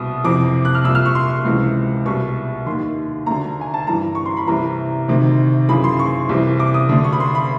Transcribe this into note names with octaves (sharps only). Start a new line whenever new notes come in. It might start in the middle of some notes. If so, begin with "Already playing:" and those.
Already playing: C2 B2 D#6
F2 C3 E3 D6
F#6
F6
C2 A#2 E6
F6
C#6
C6
C#6
C#2 C3 E3
C2 B2 C#6
D#2 D#3 C6
D2 D3 A#5
G#5
A5
G2 E3 A#5
C#6
C6
B5
C2 C3 E3 A#5
D2 C3 D#3
F#2 C#3 E3 B5
C6
C#6
C2 C3 E3
D6
D#6
D2 D3
C#6
B5
C6
B5